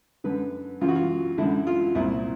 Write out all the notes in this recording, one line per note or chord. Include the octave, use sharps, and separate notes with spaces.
F#2 D3 B4
F#2 C#3 E3 F4
F#4
F4
F#2 D3 E4
F4
C2 A#2 E4